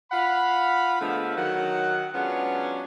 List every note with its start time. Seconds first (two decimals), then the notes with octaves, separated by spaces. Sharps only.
0.11 F4 F5 F#5 B5
1.01 D3 F3 G#3 A3 B3
1.36 D#3 F#3 F#5
2.13 F#3 G#3 B3 C#4 D4 F4